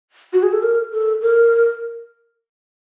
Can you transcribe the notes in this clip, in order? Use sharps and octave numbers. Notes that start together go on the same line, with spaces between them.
F#4
G#4
A4
A#4
A4
A#4